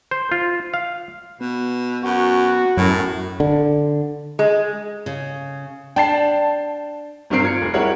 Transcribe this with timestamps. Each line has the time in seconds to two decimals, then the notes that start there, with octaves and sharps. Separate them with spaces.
0.11 C5
0.32 F4
0.74 F5
1.41 B2 B3
2.03 F#2 F#4
2.77 F#2 A2
3.40 D3
4.39 G#3
5.06 C#3
5.96 D4 G5 A5 C7
7.30 G1 G2 A#3 C4 C7 D7
7.43 F4 G#6 C#7
7.62 F1
7.74 G3 G#3 E4 A#4 C#5 F#5